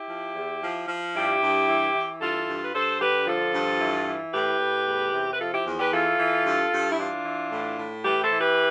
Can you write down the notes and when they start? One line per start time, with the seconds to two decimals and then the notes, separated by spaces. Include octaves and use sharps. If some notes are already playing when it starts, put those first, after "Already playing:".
Already playing: E4 G4
0.09 F3
0.35 E2
0.62 F3
0.88 F3
1.15 G2 E4 G4
1.42 G2
1.68 E3
1.95 E3
2.21 G2 F4 A4
2.48 G2
2.63 B4
2.74 G2 A4 C5
3.00 D3 G4 B4
3.27 F3 F4 A4
3.54 G2
3.80 E3
4.07 E3
4.33 A2 G4 B4
4.60 A2
4.86 E2
5.13 C3
5.32 B4
5.39 F3 F4 A4
5.53 E4 G4
5.66 E2
5.79 G4 B4
5.92 E3 F4 A4
6.19 E3
6.46 G2
6.72 G2
6.91 E4
6.98 E3 D4 F4
7.25 E3
7.52 A2
7.78 A2
8.04 E3 G4 B4
8.22 A4 C5
8.31 E3
8.40 G4 B4